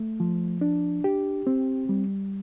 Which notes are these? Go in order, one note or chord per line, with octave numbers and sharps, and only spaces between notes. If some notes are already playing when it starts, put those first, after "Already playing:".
Already playing: A3
F3
D4
G4
C4
G3